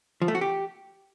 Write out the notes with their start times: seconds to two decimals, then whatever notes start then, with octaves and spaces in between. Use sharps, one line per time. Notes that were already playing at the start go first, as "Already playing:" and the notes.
0.22 F3
0.28 A3
0.35 F#4
0.41 G4